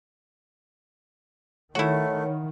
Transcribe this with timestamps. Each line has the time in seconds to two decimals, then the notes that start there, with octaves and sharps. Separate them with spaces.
1.75 D#3 A3 E4 F#4 C#5